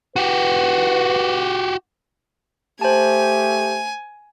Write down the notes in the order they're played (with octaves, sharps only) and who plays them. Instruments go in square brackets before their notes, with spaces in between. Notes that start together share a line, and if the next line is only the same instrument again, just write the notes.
[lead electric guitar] F#4 G4 [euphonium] B4
[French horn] A3 [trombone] G4 [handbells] C5 A5 [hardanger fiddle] G#5